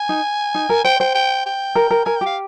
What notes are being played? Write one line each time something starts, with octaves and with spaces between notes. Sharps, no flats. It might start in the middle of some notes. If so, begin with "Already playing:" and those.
Already playing: G#5
D#4
D#4
A#4
C5 G5
C5 G5
G5
G5
A#4
A#4
A#4 G#5
G4 G5
F5